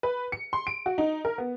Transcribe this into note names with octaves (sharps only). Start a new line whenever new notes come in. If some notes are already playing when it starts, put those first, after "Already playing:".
B4
C#7
C6
D7
F#4
D#4
A#4
B3